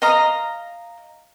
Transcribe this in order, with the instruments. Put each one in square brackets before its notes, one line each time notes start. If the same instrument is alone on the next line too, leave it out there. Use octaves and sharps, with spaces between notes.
[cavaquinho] D#5 F5 A#5 D#6